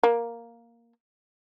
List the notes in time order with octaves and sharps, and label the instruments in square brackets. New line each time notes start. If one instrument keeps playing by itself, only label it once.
[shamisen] A#3